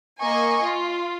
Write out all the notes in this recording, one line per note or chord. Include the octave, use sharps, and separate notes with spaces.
A#3 D#5 G#5 C#6
F4